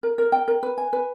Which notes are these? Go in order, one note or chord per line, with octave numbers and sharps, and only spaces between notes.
A#4
A#4
G5
A#4
B4
G#5
B4